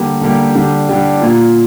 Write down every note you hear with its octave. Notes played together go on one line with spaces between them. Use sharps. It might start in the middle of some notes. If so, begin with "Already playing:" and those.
Already playing: D3 G3 A#3 G4
D3 G3 A#3 G4
D3 G3 D4 G4
D3 G3 D4 G4
A#2 A#3 F4